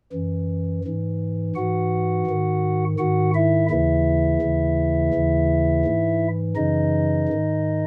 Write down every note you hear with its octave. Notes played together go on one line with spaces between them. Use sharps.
F#2 E3
G#2 E3
G#2 E3 F#4 F#5
G#2 D#3
G#2 D#3 F#4 F#5
E4 E5
D#2 C#3 E3 E4 E5
D#2 C#3 E3
D#2 C#3 E3
G#2 E3
F#2 C#3 E3 D#4 D#5
G#2 D#3